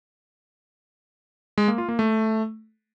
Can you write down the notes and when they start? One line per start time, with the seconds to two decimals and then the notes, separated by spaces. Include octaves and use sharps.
1.58 G#3
1.68 A#3
1.78 F4
1.89 A#3
1.99 A3